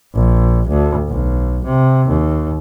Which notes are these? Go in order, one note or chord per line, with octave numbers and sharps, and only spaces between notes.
A#1
D2
B1
C3
D#2